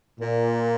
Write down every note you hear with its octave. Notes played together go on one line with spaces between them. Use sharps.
A#2